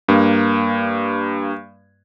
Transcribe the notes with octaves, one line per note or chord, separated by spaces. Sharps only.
G2 A#3